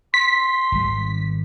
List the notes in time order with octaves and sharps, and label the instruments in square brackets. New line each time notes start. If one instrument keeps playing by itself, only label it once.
[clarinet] C6 [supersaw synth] B6
[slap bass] G#1 D#3 G3